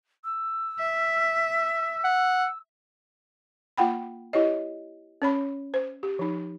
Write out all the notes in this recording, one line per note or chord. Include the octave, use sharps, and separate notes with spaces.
E6
E5
F#5
A#3 F4 F#5 G5 B5
E4 G4 C#5 D#5
C#4 C#5 B5
C5
G4
F3 D#4